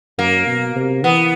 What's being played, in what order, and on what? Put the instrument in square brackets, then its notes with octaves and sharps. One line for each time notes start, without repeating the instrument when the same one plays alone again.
[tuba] F#2 [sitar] A#3
[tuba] B2
C3
[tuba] E3 [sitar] B3